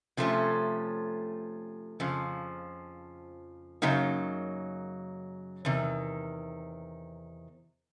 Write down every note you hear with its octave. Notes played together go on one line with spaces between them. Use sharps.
C3 F3 A3 C#4
F2 C#3 F3
F#2 C#3 F#3 A#3 D#4
E2 C3 D#3